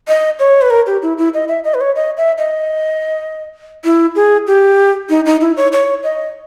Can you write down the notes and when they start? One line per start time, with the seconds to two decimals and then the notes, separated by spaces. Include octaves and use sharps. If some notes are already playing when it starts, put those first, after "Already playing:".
0.08 D#5
0.39 C#5
0.62 B4
0.70 A#4
0.87 G4
1.02 E4
1.18 E4
1.34 D#5
1.48 E5
1.64 D#5
1.74 B4
1.81 C#5
1.96 D#5
2.17 E5
2.38 D#5
3.84 E4
4.15 G#4
4.47 G4
5.10 D#4
5.26 D#4
5.41 E4
5.57 C#5
5.72 C#5
6.03 D#5